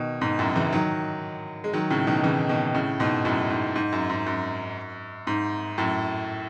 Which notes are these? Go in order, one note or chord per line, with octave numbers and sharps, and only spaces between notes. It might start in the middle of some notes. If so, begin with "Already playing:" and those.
Already playing: B2 D#3
G#2 B2
F#2 A2
C#3 E3
D#3 F#3
G#3
D#3 F#3
A2 C#3
B2 D#3
C#3 E3
B2 D#3
A2 C#3
G#2 B2
F#2 A2
G#2
G#2
F#2
G#2
F#2
G#2
F#2 A2